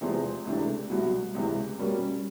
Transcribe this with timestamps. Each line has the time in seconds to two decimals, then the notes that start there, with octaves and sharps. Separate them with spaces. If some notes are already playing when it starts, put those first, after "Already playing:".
0.01 E2 C3 F3 G#3 C4
0.45 C#2 C3 E3 A3 D4
0.90 C2 B2 F#3
1.35 C#2 C3 E3
1.79 B2 G3 A#3 C#4